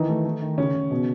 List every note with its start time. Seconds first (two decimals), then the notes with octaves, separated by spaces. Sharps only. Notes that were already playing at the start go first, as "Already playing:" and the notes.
Already playing: D#3 E3 D#4
0.09 A3
0.25 A3
0.42 D#3
0.58 C#3 C#4
0.75 C#3
0.91 B2